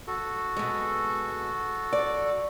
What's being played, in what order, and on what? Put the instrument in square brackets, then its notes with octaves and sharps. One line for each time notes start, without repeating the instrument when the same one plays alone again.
[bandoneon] F#4 A4
[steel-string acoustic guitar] B2 G#3
D5